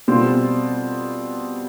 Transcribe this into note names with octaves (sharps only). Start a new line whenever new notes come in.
B2 G3 C4 F4